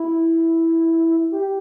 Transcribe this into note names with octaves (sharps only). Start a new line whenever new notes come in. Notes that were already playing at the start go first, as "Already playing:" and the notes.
Already playing: E4
G4